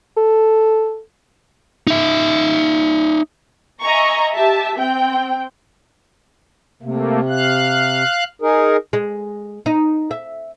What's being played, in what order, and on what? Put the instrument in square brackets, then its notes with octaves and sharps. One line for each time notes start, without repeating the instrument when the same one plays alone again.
[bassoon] A4
[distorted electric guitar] D#4 E5
[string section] D#5 E5 G#5 A#5 C#6
G4 E5 A5
C4 G5
[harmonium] C3 [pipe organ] A3 A#3
[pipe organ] F5 F#6
[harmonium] D#4 G#4 A#4
[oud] G#3
D#4
E5